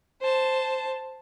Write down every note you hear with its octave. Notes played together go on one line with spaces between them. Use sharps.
C5 A5